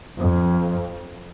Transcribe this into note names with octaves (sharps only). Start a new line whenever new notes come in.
F2